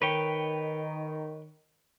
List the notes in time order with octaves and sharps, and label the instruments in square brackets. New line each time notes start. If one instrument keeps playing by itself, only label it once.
[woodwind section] D#3 [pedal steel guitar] B4 C#5 G5